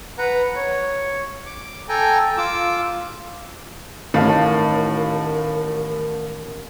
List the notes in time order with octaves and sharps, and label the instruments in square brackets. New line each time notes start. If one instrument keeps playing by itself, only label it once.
[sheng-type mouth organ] B4 F#5 A#5
C#5
D6
A4 G5 G#5 A#5
F4 D6 E6
[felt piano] A1 F5 A5 [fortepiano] A2 [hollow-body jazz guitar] D#3 [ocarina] A#4